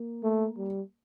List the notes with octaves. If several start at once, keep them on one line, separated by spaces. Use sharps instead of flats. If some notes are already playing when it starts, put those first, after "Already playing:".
Already playing: A#3
A3
G3